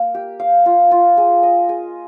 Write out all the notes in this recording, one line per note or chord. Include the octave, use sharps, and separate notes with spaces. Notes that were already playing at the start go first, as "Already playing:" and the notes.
Already playing: A#3
G4
F5
F4
F4
G#4
D#5
G#4